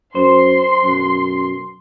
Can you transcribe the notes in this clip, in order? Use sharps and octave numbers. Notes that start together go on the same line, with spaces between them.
F#2 C5 C6
B1 F#2